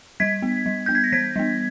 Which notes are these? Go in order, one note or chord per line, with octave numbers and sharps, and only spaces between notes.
G3 G#6 B6
B3
G3
B3 G6
G#6
A#6
E3 G#6 B6
G3 B3